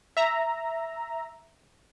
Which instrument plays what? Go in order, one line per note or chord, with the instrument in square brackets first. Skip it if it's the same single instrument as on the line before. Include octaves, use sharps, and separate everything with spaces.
[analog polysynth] E5 A#5